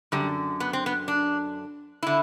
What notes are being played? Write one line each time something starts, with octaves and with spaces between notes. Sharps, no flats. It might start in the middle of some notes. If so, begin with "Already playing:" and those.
F#2 D3 G3
B3
C4
B3
D4
D3 E4